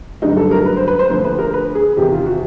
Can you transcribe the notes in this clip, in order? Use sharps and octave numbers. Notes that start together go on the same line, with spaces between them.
G2 D3 F#3 A3 D#4
A4
A#4
B4
C5
B4
C5
D2 D3 F3 A3 C5
B4
A#4
B4
G#4
E2 C3 D#3 G4
F4
F#4